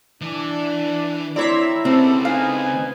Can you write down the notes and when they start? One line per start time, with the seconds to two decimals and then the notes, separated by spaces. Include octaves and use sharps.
0.21 E3 D4
1.36 C4 E4 C#5 D5 E5 A#5 C6
1.85 C#3 G#3 B3 C4 G4 A4
2.25 C4 D#4 B4 F5 G#5